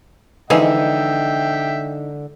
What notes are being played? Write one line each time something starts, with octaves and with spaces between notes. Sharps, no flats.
D3 E3 F3 G#3 D#4 E5 G5